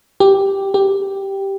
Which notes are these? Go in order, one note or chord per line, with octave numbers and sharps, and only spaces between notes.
G4
G4